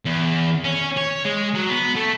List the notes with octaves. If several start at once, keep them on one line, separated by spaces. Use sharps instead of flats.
E2
C#4
C#5
G#3
F#3
B3
A3